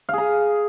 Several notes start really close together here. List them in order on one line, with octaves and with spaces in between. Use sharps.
F5 G#4 A#5